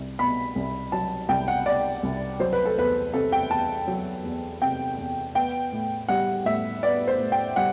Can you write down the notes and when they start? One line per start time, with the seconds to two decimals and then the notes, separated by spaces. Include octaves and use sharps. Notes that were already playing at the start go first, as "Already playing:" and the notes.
Already playing: C2
0.18 B2 B5
0.56 C2
0.92 F#3 A5
1.29 C2 G5
1.48 F#5
1.66 B2 D5
2.03 C2
2.40 F#3 C5
2.53 B4
2.65 A4
2.77 E2 B4
3.14 C3 A4
3.32 G5
3.50 E2 A5
3.87 F#3
4.24 E2
4.62 C3 G5
4.98 E2
5.35 B3 G5
5.72 A2
6.08 G3 F#5
6.45 A2 E5
6.83 B3 D5
7.08 C5
7.20 A2
7.32 G5
7.56 G3 F#5